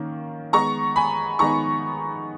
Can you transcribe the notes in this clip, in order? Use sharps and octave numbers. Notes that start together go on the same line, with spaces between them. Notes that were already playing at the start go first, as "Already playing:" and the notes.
Already playing: D#3 A#3 C#4
D#3 G#3 B3 D#4 A#5 C#6
G#5 B5
D#3 G#3 B3 D#4 A#5 C#6